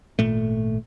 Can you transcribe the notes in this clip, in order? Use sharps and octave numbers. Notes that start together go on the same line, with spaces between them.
G#1 A#2 A3